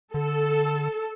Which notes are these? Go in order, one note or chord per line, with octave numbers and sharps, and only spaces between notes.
D3 A4